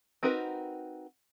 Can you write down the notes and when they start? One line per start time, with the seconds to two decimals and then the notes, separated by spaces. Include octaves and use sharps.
0.23 C4 D#4 F#4 A#4 B4